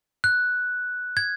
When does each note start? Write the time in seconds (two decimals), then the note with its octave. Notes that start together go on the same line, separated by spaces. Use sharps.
0.24 F#6
1.17 G#6